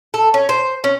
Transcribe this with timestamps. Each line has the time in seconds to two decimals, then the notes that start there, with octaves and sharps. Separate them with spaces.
0.14 A4
0.34 C#4
0.49 C5
0.84 C#4